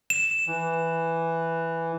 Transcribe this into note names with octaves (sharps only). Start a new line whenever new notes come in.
E7
E3